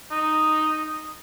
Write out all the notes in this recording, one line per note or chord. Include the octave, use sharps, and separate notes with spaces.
D#4